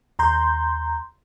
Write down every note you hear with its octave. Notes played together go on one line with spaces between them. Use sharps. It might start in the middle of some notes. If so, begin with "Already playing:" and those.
D#2 A#5 C6 G6